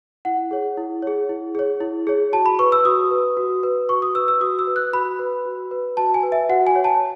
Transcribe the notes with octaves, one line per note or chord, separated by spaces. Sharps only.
E4 F#5
G#4 C#5
E4
G#4 C#5
E4
G#4 C#5
E4
G#4 C#5
F#4 A5
B5
B4 C#6
E6
F#4 D#6
B4
F#4
B4
F#4 C#6
D#6
B4 E6
E6
F#4 D#6
E6
B4
F#6
F#4 B5
B4
F#4
B4
F#4 A5
G#5
B4
E5
F#4 F#5
G#5
C#5
A5